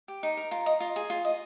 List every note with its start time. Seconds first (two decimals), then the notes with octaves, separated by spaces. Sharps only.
0.08 G4
0.23 D#4
0.37 A#4
0.51 F4 A#5
0.66 D#5
0.80 F4
0.96 G#4
1.10 F4
1.25 D#5